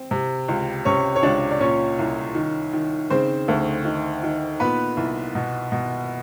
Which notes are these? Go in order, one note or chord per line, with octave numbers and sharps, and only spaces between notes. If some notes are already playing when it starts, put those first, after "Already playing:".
Already playing: C4
C3
C#2
C3 C#4 C#5
C#5
C#2 D4 D5
D5
A#2 C#4 C#5
C2
D#3
D#3
C#3 C4 C5
D2
D#3
D#3
A#2 B3 B4
C2
B2
B2